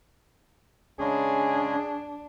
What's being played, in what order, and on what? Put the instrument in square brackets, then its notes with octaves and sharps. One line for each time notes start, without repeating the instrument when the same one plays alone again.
[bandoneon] C#3 G#3 C#4 [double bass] D4 [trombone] G#4